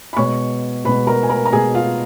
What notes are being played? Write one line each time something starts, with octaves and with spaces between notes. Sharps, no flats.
B5
B2 G#3 B3 C#5 C#6
B2 G#3 B3 B4 B5
A#4 A#5
G#5
A#4 A#5
A#5
B2 G#3 B3 G#4 G#5
F4 F5